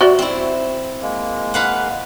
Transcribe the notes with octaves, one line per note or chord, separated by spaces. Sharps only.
F#4 D5 E5
C4 E4
G#3 A#3
B4 F5 F#5